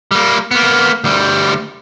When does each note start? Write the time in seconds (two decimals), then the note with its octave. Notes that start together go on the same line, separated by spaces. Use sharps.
0.11 G3 A#3
0.51 A#3 B3
1.04 D2 G3